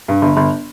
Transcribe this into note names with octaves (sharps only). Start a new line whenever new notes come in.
G2
G1
G1